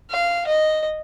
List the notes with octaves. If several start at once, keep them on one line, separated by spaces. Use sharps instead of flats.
F5
D#5